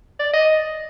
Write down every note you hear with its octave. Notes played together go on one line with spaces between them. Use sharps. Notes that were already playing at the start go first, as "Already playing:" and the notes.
D5
D#5